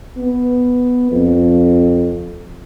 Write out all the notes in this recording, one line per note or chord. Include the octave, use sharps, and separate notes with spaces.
B3
F2